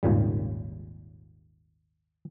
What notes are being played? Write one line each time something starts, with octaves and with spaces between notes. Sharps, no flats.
G#1 D#2 A#2 C#3 G3